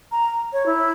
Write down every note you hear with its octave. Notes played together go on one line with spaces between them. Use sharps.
A#5
C#5
E4